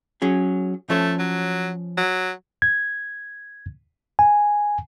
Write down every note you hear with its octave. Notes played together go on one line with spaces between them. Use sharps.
F#3 C#4 G#4
F3 A3 C#4 C#5
F#3
F#3
G#6
G#5